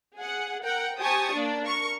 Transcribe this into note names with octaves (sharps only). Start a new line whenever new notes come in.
G#4 F#5
A#4 F#5 G5
G4 C5 G#5 A5 C#6 D#6
A#3 D4 D5
A#4 C#6